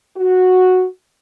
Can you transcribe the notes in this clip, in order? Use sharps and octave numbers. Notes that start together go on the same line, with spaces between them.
F#4